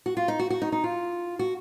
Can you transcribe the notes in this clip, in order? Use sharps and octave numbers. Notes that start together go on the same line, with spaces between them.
F#4
F4
D#4
F#4
F#4
D#4
D#4
F4
F#4